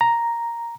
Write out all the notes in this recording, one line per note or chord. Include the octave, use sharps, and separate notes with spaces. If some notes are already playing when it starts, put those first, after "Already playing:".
A#5